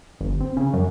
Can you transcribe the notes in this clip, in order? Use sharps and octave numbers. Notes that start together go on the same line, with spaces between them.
G1
C4
C#3
F#2